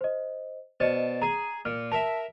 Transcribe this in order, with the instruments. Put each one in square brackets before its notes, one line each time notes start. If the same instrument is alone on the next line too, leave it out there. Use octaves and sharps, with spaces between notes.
[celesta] C5 D#5
[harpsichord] B2 A5 [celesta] C5 D5 D#5
[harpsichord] G#4 G#5 [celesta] A#5
[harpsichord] A#2 [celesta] F6
[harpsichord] A#4 E5 [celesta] A5